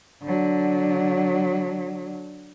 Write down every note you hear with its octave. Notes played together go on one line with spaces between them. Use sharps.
D3 F#3